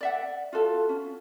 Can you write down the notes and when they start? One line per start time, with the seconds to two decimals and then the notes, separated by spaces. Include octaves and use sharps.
0.01 D5 E5 F#5
0.53 F4 F#4 A4 F5
0.89 C#4